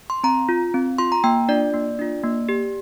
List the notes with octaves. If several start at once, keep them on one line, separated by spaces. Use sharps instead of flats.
C6
C4 A#5
F4
C4
F4 C6
A#5
A#3 G5
D4 F4 D5
A#3
D4 F4
A#3
G4